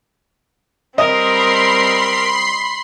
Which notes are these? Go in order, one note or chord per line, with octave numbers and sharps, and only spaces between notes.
G3 C4 A#4 D#5 B5 C6 C7